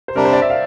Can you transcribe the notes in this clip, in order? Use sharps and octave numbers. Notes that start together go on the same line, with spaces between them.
C5
C3 G3 D4 A#4
C5
D5
E5
F5